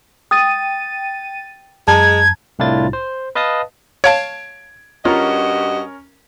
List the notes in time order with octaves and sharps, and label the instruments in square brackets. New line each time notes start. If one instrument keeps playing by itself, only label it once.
[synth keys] G5 A6 D#7 [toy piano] D#6
[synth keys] F#2 [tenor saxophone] G#3 [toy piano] A5 A#5 [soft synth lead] G#6
[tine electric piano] C2 A2 D4 E4 F4 A6
C5
B4 D#5 F5 A5 D#6
[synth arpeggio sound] C#5 F5 A5 [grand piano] G#6 D7
[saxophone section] G2 F#4 D#5 [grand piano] C#4 A#4 [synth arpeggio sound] F4